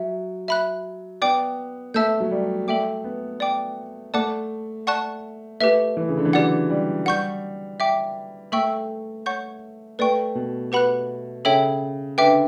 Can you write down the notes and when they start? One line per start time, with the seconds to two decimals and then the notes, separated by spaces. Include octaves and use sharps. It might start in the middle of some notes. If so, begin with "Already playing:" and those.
Already playing: F#3 E5
0.48 E5 B5 F#6
1.22 B3 D5 G5 D6
1.94 A3 E5 A5 E6 G6
2.20 F#3
2.31 G3
2.68 A3 A4 E5 G5 D6
3.04 B3
3.40 D5 G5 D6
4.14 A3 D5 F#5 A5 D6 F#6
4.87 D5 F#5 A5 C#6 F#6
5.60 A3 G4 B4 E5
5.97 E3
6.09 C#3
6.17 D3
6.25 E3
6.33 F#3 G4 D5 F#5
6.70 G3
7.06 G3 F#5 C#6 G6
7.80 E5 G5 D6
8.52 A3 A4 E5 G5 C#6 E6
9.26 C#5 F#5 C#6 G6
9.99 A3 B4 D5 G5 C#6
10.35 B2
10.72 G4 B4 F#5 B5 F#6
11.45 C#3 A4 C#5 E5 G5
12.18 D3 B4 E5 G5 D6